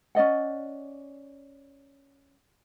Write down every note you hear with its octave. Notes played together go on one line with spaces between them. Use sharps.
C#4 D5 D#5 F#5